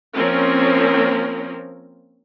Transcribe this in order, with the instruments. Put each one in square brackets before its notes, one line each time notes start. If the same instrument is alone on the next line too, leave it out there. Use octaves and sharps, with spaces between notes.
[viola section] F3 A#3 C4 C#4 A#4